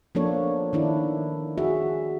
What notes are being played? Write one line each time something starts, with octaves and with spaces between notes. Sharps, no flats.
F3 A#3 B3 D4 A4 C#5
D#3 D4 E4
F#4 G#4 E5